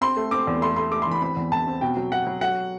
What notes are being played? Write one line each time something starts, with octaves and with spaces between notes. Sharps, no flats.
C4 C6
A3
C4 D6
E2
A3 C6
A3 C6
A3 D6
C6
E3 B5
C4 B5
E2
E2 A5
C4
B2 G5
F#3
F#3 F#5
F#3
F#3 F#5